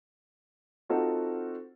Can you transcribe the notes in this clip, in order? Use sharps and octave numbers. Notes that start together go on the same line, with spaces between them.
C4 D#4 F4 F#4 A4 C5